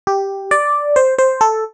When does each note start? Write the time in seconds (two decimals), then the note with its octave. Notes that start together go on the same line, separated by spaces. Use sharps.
0.07 G4
0.51 D5
0.96 C5
1.19 C5
1.41 A4